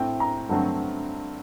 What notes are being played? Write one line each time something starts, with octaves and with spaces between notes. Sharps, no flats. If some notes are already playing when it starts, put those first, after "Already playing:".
Already playing: A2 A3 C4 G5
A#5
G2 D3 F#3 A3 C4